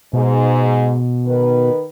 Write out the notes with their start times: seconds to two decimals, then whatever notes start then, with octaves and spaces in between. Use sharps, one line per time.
0.13 G#2 B2
1.25 D#3 B4